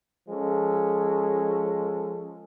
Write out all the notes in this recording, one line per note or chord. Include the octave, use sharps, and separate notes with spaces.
F3 G#3 C#4 A4